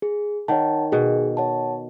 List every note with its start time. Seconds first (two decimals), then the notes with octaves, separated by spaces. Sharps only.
0.02 G#4
0.48 D#3 C#5 F#5 A5
0.92 B2 G#4
1.37 C#5 F#5 A5